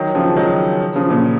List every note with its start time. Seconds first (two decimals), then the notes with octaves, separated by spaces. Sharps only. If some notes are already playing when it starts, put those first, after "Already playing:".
Already playing: D#3 F#3
0.15 C#3 F3
0.36 D#3 F#3
0.96 C#3 F3
1.10 A#2 C#3